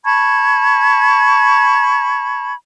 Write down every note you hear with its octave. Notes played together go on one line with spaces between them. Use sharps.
A5 B5 C#6 G#6